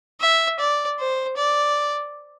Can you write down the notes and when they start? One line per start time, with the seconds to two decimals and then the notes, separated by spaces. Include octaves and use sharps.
0.21 E5
0.59 D5
0.99 C5
1.37 D5